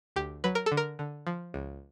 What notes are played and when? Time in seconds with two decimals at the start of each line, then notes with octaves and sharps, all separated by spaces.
0.16 D2 G4
0.44 F#3 B4
0.55 A#4
0.66 A4
0.72 D3
0.77 A#4
0.99 D3
1.27 F3
1.54 C#2